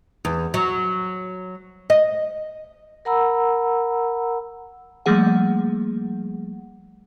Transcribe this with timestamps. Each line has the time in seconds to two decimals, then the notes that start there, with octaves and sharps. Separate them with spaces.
0.25 E2
0.54 F#3
1.90 D#5
3.05 A#4 F#5 A#5 B5 E6
5.06 F3 G3 A3 A#3 G#4 F#5